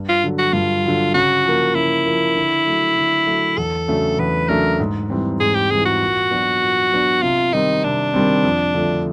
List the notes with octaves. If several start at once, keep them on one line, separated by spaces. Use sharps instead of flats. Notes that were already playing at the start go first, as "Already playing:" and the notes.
Already playing: G2
F4
D3 F#3
F#4
G2 F4
D3 F#3
C#3 F#4
F3 A#3
C#3 E4
F3 A#3
D3
F#3 A3
D3
F#3 A3
E2 A4
C#3 F#3 A3 D4
E2 B4
C#3 F#3 A3 D4 A#4
G#2
E3 G3 C4
G#2 G#4
G4
E3 G3 C4 G#4
F#4
A#2
F#3 B3 D4
A#2
F#3 B3 D4
C3 F4
D#3 G3 C4 D#4
C3 D4
D#3 G3 C4
F2
D3 F3 A3